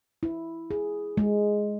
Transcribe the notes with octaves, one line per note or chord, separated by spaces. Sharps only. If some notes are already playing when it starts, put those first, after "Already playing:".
E4
G#4
G#3